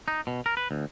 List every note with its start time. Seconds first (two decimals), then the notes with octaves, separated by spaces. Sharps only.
0.08 D#4
0.27 B2
0.46 A#4
0.57 B4
0.71 D2